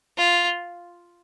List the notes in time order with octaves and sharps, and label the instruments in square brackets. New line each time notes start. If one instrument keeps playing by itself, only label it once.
[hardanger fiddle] F4